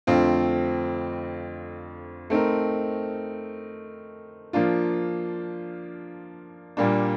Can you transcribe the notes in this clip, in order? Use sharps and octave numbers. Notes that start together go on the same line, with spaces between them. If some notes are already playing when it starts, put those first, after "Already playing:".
F2 D3 A3 C4 F4
A3 C4 D#4 A#4
F3 A#3 D4 F4
A#2 G3 A#3 D4